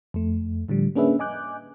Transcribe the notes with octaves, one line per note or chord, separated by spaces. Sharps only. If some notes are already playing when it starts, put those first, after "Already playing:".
F2 A3
A2 D3 F3 G3
A#3 C#4 D4 G#4 B4 E5
D#5 G#5 D6 F#6 G6